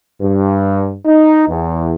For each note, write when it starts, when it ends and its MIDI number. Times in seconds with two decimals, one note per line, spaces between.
0.21 0.94 43
1.06 1.46 63
1.49 1.94 40